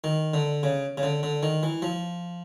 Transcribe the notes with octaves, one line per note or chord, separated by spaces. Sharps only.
D#3
D3
C#3
C#3
D3
D3
D#3
E3
F3